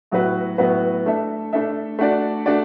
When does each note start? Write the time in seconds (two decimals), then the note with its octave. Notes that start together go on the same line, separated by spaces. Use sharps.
0.12 A2 F#3 B3 F#4 B4
0.58 A2 F#3 B3 F#4 B4
1.06 A3 D4 A4 E5
1.53 A3 D4 A4 E5
1.99 A3 D4 F#4 D5
2.46 A3 D4 F#4 D5